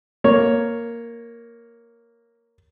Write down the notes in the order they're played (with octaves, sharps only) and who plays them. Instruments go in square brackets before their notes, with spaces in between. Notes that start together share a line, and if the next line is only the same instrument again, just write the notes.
[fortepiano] A#3 C#5